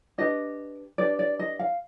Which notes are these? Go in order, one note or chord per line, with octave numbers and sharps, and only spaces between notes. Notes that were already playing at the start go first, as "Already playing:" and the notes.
D4 G4 B4 D#5
D4 G4 B4 D5
D5
D#5
F5